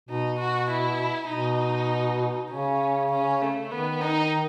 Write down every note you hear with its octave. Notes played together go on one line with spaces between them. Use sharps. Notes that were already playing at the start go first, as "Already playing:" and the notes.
B2 D#4
F#4
E4
B2 D#4
C#3 C#4
C#4
A3
D#3 B3
D#4